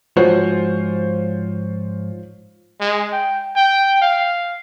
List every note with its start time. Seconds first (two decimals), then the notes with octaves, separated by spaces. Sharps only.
0.16 G#2 F3 F4 F#4 C5 C#5
2.80 G#3
3.13 G5
3.56 G5
4.02 F5